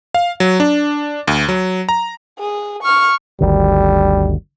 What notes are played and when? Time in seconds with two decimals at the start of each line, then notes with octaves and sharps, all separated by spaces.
0.14 F5
0.40 F#3
0.60 D4
1.27 D2
1.49 F#3
1.89 A#5
2.39 G#4
2.83 C#6 F6
3.41 G1 D2 D#3 G3